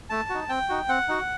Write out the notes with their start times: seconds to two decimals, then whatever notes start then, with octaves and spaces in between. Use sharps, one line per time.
0.10 A3 A5
0.30 D#4 F#4
0.49 C4 G5
0.69 D#4 F#4
0.89 C4 F#5
1.08 D#4 F#4